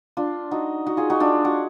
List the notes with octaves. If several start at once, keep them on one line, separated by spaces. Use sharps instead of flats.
D4 F4
D#4 F#4
D#4 F#4
F4 G#4
D#4 F#4
D4 F4
F#4